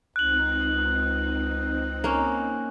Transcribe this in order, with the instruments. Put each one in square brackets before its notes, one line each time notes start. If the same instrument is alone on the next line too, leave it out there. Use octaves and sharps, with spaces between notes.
[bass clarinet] C#2 [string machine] C4 D#4 [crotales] F#6 F#7
[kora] A#3 C#4